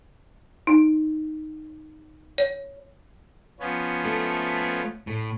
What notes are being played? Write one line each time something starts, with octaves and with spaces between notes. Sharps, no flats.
D#4
C#5
F3 B3 C#4
A3 A4
A2